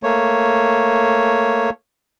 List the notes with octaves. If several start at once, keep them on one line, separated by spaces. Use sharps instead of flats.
A3 A#3 C#5